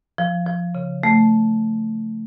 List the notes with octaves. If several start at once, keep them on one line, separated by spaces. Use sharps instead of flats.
F3
F3
C#3
A3